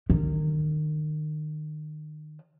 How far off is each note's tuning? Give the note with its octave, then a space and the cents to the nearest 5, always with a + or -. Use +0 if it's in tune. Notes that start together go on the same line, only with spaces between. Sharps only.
D#3 -30